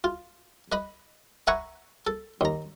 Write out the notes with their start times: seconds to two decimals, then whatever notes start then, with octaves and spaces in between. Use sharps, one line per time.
0.04 F4
0.72 B4 D#5 B5
1.47 B4 E5 F#5 G#5 A#5 C#6
2.07 A4
2.41 D#2 A#5